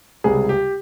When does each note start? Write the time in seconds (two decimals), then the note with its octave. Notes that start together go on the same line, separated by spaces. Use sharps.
0.24 C#2 C3 G3 G#4
0.49 G4